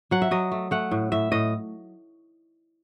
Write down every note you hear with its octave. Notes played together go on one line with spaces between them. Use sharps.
F#3 F#5
E5
F#3 D#5
A3
A3 F#5
A2
A2 E5
A2 D#5